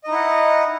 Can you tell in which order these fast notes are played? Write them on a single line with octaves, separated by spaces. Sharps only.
D#5 D#4 E4 F#5